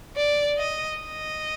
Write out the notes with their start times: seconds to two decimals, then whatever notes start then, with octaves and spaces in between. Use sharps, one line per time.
0.16 D5
0.58 D#5
1.00 D#5